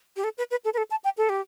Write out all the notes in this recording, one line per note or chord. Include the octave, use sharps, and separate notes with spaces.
G4
A4
B4
B4
A4
B4
A4
A5
G5
A4
G4